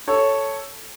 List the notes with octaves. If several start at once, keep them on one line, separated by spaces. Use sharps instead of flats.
A4 C#5